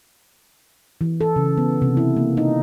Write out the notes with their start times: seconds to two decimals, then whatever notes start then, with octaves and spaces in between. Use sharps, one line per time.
1.01 E3
1.21 A4
1.36 C#3
1.58 B3
1.82 C3
1.97 E4
2.16 A#3
2.37 D#4